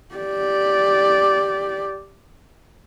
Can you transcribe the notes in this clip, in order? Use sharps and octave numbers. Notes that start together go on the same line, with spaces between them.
G4 D5